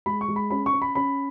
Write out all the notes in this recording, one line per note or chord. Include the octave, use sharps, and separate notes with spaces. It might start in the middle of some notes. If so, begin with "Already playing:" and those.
G#3 B5
C#6
G#3
B5
C#4 B5
C#6
C#4
B5
C#4 B5